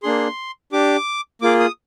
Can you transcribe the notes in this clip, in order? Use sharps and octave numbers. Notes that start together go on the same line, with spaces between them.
A#3 D4 G#4 C6
D4 G4 D6
A#3 F4 G#4 D6
D#6